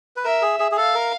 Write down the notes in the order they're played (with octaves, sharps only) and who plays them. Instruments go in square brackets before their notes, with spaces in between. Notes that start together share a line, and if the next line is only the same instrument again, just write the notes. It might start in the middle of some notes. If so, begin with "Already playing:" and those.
[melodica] B4
[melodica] A#4 [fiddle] E5
[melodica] G#4
G#4
G#4
[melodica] A4 [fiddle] F5
[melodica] A#4